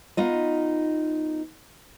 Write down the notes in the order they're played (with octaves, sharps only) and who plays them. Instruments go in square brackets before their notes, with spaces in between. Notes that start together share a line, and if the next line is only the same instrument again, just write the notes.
[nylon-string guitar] B3 D#4 F4 D#5